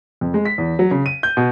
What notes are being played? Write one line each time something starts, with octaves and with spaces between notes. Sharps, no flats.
F2
G#3
B6
E2
F#3
C#3
D#7
G6
B2